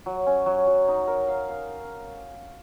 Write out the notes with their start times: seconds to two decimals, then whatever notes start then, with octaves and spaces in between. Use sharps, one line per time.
0.06 F#3
0.27 C#4
0.46 F#3
0.67 F#3
0.88 D#4
1.07 A#4
1.28 F5
1.49 F5